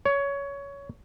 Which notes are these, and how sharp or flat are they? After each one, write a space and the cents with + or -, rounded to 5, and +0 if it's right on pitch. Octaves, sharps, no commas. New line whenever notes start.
C#5 +15